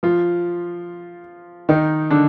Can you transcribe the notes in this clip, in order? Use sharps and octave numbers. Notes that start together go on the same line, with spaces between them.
F3 F4
D#3 D#4
D3 D4